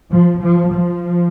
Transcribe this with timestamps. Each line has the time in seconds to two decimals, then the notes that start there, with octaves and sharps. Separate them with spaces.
0.10 F3
0.41 F3
0.71 F3